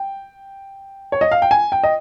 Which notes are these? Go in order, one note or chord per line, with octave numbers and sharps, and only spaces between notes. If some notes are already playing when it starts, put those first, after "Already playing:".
Already playing: G5
C#5
D#5
F5
G5
G#5
G5
D#5